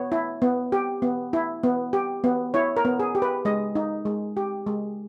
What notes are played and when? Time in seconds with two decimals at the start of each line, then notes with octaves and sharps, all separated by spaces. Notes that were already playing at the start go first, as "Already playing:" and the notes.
Already playing: B3 C#5
0.12 E4
0.42 B3
0.72 G4
1.02 B3
1.33 E4
1.63 B3
1.93 G4
2.24 B3
2.54 E4 C#5
2.77 A#4
2.85 B3
3.00 G#4
3.15 G4
3.22 B4
3.45 G#3 D#5
3.75 D#4
4.05 G#3
4.37 G4
4.67 G#3